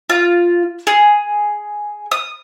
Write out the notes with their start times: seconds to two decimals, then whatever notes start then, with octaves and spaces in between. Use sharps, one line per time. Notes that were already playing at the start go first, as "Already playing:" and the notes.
0.10 F4
0.87 G#4
2.11 D#6